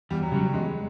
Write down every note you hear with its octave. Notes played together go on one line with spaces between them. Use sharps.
E2 G3
F#3
C#3 F#3 G3
E2 G#3